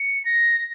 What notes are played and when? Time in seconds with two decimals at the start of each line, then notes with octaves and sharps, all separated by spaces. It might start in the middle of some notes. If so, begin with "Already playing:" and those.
Already playing: C#7
0.25 A#6